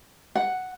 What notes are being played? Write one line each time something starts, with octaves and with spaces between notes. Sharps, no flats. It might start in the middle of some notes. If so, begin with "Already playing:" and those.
F#5